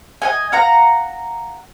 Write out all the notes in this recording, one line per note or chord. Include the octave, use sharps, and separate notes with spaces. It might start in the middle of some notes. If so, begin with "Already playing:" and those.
D#5 F#5 G#5
F5 F#5 A#5